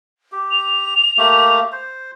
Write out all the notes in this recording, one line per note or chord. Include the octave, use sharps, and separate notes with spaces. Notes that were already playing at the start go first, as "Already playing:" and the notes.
G4
F7
A3 A#3 G4
C5